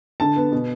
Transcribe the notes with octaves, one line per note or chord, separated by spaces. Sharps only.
D3 A5
B3
B2